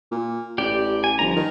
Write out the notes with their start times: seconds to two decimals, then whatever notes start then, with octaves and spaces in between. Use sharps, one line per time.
0.11 A#2
0.58 A1 G4 D5
1.04 G#5
1.19 G1 F3 A#5
1.36 D#3